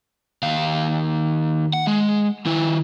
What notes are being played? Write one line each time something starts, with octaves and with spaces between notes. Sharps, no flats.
D#2 F5
F#5
G#3
D#3 E4